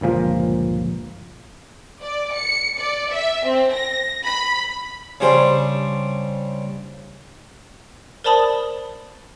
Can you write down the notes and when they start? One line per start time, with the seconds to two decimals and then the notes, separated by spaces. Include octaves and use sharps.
0.01 G1 C#2 A#2 F3
2.01 D5
2.35 C#7
2.79 D5
3.11 E5
3.45 C4
3.74 A#6
4.25 B5
5.20 C#3 G3 D4 C5
8.24 A#4 C5 D5 A5 B5 D#6